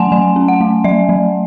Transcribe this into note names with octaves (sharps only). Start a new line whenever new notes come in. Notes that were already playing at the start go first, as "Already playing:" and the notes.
Already playing: F#3 A3 C#4 F#5 G#5 A5 C6
F#3 G#5
C#4
F#5
A3
F#3 E5
F#3